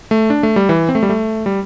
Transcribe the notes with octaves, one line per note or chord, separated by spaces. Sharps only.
A3
D4
A3
G3
E3
C4
A3
G3
A3
G3